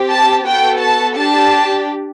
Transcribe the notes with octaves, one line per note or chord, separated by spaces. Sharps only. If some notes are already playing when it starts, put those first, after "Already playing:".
Already playing: C4 G4
A5
B3 F#4 A4 G5
A5
D4 G4 A5